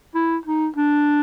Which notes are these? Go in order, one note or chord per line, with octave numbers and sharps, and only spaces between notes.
E4
D#4
D4